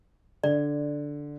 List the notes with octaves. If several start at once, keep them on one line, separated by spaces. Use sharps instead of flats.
D3 D5